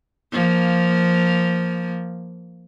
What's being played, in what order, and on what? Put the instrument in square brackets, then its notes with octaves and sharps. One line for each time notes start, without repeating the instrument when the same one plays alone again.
[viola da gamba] F3 A#3